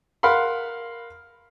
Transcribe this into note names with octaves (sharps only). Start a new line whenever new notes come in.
A#4 F5 F#5 B5 C6